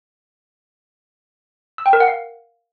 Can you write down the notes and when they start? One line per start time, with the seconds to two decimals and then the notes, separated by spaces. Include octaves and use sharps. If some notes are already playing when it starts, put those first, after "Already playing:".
1.78 E6
1.86 G5
1.93 A#4
2.00 F#5
2.08 F5